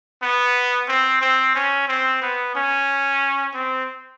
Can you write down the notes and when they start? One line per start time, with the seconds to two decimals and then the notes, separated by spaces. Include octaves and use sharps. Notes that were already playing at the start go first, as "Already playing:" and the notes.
0.23 B3
0.88 C4
1.21 C4
1.55 C#4
1.88 C4
2.22 B3
2.55 C#4
3.54 C4